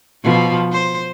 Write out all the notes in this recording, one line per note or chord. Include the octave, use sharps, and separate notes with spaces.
B2 F3
C5